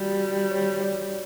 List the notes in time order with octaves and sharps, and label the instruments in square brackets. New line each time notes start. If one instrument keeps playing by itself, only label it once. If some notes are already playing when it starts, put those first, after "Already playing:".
Already playing: [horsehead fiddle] G3 [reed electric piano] F#4
[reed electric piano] C#5
D5